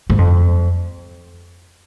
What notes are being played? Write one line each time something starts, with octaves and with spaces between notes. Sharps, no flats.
G#2
F2